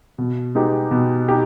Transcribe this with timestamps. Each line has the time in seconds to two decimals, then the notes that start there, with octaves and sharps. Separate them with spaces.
0.18 B2
0.55 G#3 B3 D#4 G4
0.91 B2
1.28 D#4 G4